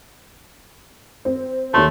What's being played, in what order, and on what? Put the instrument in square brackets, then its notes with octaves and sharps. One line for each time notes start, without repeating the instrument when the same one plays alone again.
[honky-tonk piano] C4
[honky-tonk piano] D#2 C#5 C6 [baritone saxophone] A3